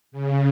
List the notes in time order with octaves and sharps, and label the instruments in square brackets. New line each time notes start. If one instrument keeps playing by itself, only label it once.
[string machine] C#3